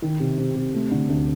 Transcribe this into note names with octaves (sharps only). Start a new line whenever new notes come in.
D#3
C3
C3
C3
A3
D3
D2